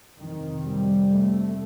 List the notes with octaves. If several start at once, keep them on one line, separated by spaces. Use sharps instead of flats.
F2 C3 D#3
G3
A3